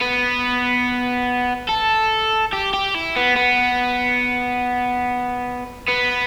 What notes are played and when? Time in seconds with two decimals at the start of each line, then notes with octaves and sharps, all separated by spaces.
0.01 B3
1.69 A4
2.53 G4
2.74 G4
2.95 E4
3.16 B3
3.36 B3
5.89 B3